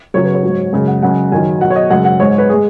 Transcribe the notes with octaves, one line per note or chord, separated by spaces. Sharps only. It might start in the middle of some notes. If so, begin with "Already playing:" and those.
F#2 C#3 F#3 C#5
B4
C#5
G#2 F#3
F#2 C#3 G#3
F#5
F#2 C#3 G#3 F#5
F#2 D#3 F#3 G#5
B2 F#3 F#5
C#5
D#5
F#2 C#3 G#3 F#5
F#5
G#2 G#3 C#5
B4
G#3 G#4